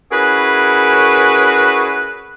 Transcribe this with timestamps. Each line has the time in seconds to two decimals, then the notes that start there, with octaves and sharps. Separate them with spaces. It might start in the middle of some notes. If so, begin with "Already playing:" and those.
0.12 C#4 E4 F#4 G#4 A#4 B4